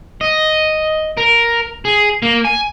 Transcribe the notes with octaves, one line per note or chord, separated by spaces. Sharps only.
D#5
A#4
G#4
A#3
G#5